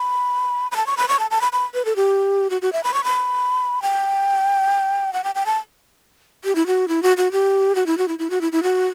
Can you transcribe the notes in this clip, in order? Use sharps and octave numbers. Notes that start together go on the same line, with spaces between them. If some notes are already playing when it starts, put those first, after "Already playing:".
Already playing: B5
B5
A5
C#6
B5
C#6
A5
A5
B5
B5
B4
A4
G4
F#4
F#4
E5
B5
C#6
B5
G5
F#5
G5
G5
A5
G4
E4
F#4
E4
F#4
F#4
G4
F#4
E4
F#4
E4
E4
F#4
E4
E4
F#4